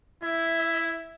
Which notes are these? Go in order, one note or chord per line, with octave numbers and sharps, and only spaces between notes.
E4 E5